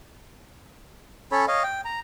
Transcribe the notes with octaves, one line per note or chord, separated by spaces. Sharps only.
C#4 A4 C#5 B5
C#5 D#5 F5
G5
A#5